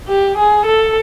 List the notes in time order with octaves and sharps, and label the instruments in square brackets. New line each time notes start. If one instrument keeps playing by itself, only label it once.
[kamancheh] G4
G#4
A4